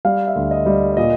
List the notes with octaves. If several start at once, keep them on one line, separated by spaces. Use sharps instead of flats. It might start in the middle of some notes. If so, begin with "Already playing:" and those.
G3 F5
E5
D2
D#5
G3
D5
A#2 D#5